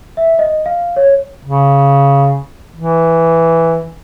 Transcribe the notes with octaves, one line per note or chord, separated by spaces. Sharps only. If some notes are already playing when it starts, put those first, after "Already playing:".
E5
D#5
F5
C#5
C#3
E3